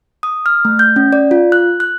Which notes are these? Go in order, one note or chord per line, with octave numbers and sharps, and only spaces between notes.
D#6
F6
A3
G6
C#4
D5
F4
F#6
F#6